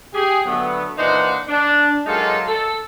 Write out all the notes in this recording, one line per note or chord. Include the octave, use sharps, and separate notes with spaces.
G4 G#4
D3 F#3 A3 B3
A#2 E3 D4 D#4 C5 F#5
D4
F#3 G#3 A#3 D#4 F4 A4
A4